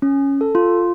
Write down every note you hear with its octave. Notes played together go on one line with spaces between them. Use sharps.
C#4
A4
F4